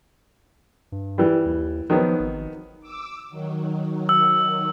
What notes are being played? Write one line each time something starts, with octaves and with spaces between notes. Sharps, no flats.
G2
E3 G3
D#2
D#3 F3 F#3 B3
G#1
D6 E6
D#3 F#3
E6